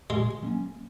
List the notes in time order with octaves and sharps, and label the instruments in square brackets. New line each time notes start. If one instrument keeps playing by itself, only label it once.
[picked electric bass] A#2 [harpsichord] G#3
[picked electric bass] F#3 A#3 C#4